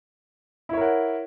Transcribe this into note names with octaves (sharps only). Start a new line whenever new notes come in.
E4 A#4 C#5 F#5